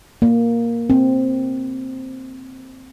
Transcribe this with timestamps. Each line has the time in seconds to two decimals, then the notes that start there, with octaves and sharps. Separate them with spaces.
0.22 A#3
0.90 C4